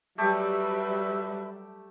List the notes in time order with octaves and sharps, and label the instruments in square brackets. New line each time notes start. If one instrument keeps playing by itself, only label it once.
[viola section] F#3 G3 [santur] A3 G4 A5 [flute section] B4 E5 B5